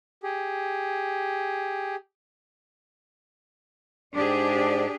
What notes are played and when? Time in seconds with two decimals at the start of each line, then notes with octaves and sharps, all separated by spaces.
0.23 G4 G#4
4.14 G#2 D4 G4 G#4 D5